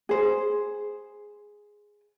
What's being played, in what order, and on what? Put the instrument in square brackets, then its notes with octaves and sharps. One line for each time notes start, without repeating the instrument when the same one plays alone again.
[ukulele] G#4 C5